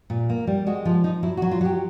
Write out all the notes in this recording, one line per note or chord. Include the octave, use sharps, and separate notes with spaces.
A#2
A#3
G3
G#3 F#4
F3 F4
F3 D#4
F#3 E4
F#4
F#3
F4
F#3 G4